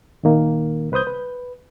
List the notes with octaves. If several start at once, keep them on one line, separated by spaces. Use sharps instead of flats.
D#2 A#2 D#3 A#3
C2 B4 C5 D#6 G6
B4